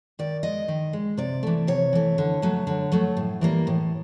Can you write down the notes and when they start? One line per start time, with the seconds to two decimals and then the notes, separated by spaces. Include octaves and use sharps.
0.19 D#3 D5
0.43 G#3 D#5
0.68 D#3
0.93 G#3
1.17 C3 D5
1.43 E3 A3
1.67 C3 C#5
1.93 E3 A3
2.18 D3
2.42 F#3 A3
2.67 D3
2.92 F#3 A3
3.17 A2
3.41 E3 G3 A#3
3.67 A2